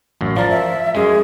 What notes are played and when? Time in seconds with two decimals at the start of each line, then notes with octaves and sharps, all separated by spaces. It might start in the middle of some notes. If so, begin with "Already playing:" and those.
0.21 A1 F#2
0.36 F3 A#4 D5 A5
0.50 E5
0.95 F#2 G#3 G#4